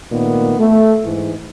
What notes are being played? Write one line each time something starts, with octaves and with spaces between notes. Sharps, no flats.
A#2 D#3 A3 B3
A3
G#2 E3